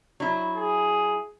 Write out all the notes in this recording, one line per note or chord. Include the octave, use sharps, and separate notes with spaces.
F#3 E4
G#4